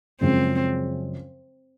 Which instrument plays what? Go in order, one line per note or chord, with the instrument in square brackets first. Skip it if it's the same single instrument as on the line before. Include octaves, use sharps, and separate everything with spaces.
[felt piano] F#2 C#3 F3 G#3 [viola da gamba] C4